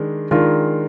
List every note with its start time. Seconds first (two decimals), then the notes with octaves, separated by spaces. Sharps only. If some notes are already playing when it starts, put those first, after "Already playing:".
Already playing: D#3 G#3 D4 A#4
0.31 D#3 G#3 D4 F4 A#4